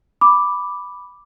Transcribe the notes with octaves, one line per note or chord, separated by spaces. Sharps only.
B5 D6